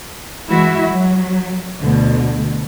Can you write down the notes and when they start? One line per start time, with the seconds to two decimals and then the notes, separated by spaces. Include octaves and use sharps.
0.49 E3 G#3 E4 F#4 E5
0.88 F#3
1.82 D2 B2 D3